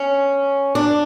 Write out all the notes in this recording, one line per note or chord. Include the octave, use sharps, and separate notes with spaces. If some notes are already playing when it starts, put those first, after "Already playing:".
Already playing: C#4
D4